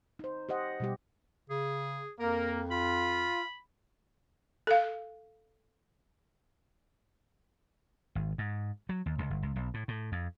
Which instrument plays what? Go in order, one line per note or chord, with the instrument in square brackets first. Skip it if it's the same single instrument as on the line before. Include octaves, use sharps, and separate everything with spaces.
[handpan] D#4 C5
G4 C5 D#5 F#5
B2 G3 G4
[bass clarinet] C#3 [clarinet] G#4
[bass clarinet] F2 [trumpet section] A#3 [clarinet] A#4
[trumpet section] F4 [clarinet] B5
[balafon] A4 F5
[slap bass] G#1
G#2
F#3
D#2
C#2
G1
C#2
B1
A2
A2
F2